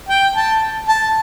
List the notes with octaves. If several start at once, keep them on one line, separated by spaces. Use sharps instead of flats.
G5
A5
A5